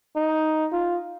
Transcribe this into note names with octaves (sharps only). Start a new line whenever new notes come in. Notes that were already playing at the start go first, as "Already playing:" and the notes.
D#4
F4